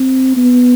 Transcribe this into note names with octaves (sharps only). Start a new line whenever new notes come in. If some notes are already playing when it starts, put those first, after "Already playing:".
Already playing: C4
B3